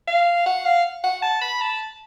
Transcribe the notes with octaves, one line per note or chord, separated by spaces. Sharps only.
F5
F#5
F5
F#5
A5
B5
A5